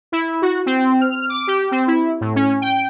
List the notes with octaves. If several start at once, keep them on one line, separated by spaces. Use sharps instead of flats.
E4
F#4
C4
F6
D6
G4
C4
E4
A2
C#4
G5